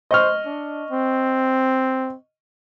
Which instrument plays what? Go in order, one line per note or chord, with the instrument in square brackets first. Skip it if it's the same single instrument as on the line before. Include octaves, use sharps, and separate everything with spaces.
[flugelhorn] C5 [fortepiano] D#5 C#6 F6
[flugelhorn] D4
C4